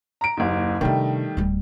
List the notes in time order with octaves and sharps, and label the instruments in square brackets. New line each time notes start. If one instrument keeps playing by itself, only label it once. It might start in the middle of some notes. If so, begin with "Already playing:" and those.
[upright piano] A#5 D7
F#1 D#2
[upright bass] C3 D4 [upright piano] D#3 G3 A3
[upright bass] D1 G3